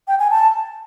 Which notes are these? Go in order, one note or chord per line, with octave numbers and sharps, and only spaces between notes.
G5
G#5
A5